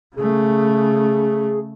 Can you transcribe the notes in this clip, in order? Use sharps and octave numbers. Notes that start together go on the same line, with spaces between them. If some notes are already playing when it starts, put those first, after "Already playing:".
C#3 A3 G#4